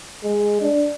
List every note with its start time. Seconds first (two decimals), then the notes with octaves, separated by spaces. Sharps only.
0.24 G#3
0.61 D4